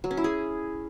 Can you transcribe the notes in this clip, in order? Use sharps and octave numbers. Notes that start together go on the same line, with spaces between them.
F#3
C#4
E4
G#4